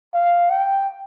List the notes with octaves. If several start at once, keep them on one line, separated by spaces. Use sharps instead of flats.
F5
G5